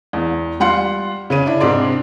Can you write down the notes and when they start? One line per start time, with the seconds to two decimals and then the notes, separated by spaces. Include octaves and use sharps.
0.13 E2
0.60 G3 F4 F#5 C6 C#7
1.30 C#3 C#4 D#7
1.46 D4 E4
1.60 G#2 C3 G#3 D4 D5 C6